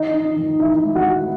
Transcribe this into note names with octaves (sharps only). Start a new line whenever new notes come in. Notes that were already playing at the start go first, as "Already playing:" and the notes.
Already playing: D#3 D#4 D#5
D#4
D#3
D#3 E4 E5
G#3
F#4 F#5
D#3